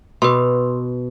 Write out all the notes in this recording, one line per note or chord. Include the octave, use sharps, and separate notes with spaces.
B2 B4 C6